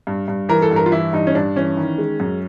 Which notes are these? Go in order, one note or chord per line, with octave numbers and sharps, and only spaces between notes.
G2
G2
E3 A#4
A4
G2
A#4
F4
E3 E4
G2 D#4
C#4
G2 D4
E3 C#4
D#3
G#3
F#2